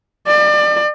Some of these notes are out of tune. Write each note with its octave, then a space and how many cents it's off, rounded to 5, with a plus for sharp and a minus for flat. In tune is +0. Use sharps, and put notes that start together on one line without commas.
D5 +35